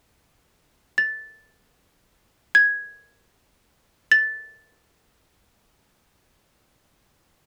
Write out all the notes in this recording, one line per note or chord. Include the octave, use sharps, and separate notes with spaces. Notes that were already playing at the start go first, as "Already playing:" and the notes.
A6
G#6
A6